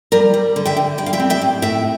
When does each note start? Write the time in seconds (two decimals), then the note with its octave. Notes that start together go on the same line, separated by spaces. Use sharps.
0.12 G3 A#4 D5
0.34 G3
0.56 D3
0.65 E5 G5
0.77 D3
0.98 G3 G5
1.06 F5
1.13 E5 G5
1.20 C4
1.30 E5 G5
1.41 A2
1.62 A2 E5 G5